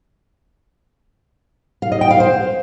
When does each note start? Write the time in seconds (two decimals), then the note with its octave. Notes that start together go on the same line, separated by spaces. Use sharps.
1.82 F5
1.92 D#5
2.01 G5
2.11 F5
2.20 C5